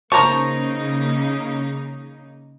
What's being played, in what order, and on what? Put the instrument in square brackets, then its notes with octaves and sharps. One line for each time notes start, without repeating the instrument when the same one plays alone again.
[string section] C#3 A#3 D#4 [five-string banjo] A#4 C5 A5 [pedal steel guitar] A#5 C#6